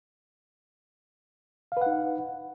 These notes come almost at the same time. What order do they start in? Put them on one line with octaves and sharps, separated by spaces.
F5 B4 F#5 D#4